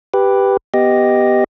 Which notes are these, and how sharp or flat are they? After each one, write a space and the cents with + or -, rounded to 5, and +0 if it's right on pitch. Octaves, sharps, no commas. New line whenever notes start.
G4 +0 B4 +0
B3 +0 G4 +0 D#5 +0